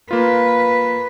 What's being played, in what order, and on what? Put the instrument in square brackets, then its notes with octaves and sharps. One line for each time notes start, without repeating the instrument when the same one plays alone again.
[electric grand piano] A#3 F4 [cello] B4